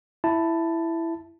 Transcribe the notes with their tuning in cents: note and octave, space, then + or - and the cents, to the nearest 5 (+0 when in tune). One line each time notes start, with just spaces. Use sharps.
E4 +5 A5 +5